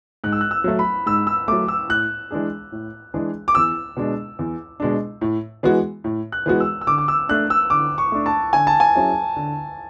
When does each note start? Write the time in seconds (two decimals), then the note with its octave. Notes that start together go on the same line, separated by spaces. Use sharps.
0.24 G#2 F#6
0.32 E6
0.41 F#6
0.51 E6
0.64 F#3 A3
0.79 B5
1.06 G#2 E6
1.27 E6
1.48 F#3 A3 D6
1.68 E6
1.89 A2 F#6
2.31 E3 G#3 D4 G#4
2.72 A2
3.14 E3 G#3 D4 G#4
3.48 D6
3.55 E2 E6
3.97 B2 G#3 D4
4.39 E2
4.80 B2 G#3 D4
5.21 A2
5.63 E3 G#3 B3 F#4
6.04 A2
6.32 F#6
6.46 E3 G#3 B3 F#4
6.60 E6
6.81 E6
6.87 D3 D6
6.98 D6
7.08 E6
7.29 A3 D4 F#6
7.50 E6
7.70 D3 D6
7.98 C#6
8.12 A3 D4
8.26 A5
8.53 D3 G#5
8.67 A5
8.80 G#5
8.95 F#3 C#4 E4 G#4
9.36 D3